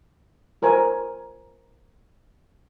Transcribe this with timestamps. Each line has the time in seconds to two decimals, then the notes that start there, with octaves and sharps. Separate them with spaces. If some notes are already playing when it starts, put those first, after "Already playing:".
0.62 F4 A#4 C5 G#5